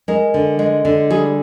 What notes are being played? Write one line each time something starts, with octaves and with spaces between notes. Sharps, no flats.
G#3 A#4
D3
G#3
D3
G3 G#4